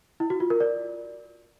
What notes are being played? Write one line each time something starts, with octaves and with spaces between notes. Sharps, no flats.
E4
F#4
F4
A#4
D5